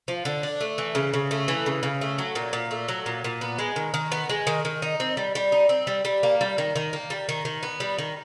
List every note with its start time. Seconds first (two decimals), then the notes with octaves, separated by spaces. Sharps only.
0.08 F3
0.25 D3
0.43 D4
0.61 A3
0.78 E3
0.95 C#3
1.13 C#3
1.31 A3
1.48 E3
1.66 C#3
1.83 C#3
2.01 A3
2.18 F#3
2.35 A#2
2.53 A#2
2.71 A3
2.88 F#3
3.06 A#2
3.24 A#2
3.41 B3
3.58 G#3
3.76 D#3
3.94 D#3
4.12 B3
4.29 G#3
4.47 D#3
4.65 D#3
4.82 D#4
5.00 C4
5.17 G3
5.35 G3
5.52 D#4
5.69 C4
5.87 G3
6.05 G3
6.23 A#3
6.41 G3
6.58 D#3
6.76 D#3
6.93 A#3
7.10 G3
7.29 D#3
7.45 D#3
7.63 B3
7.80 G3
7.98 D#3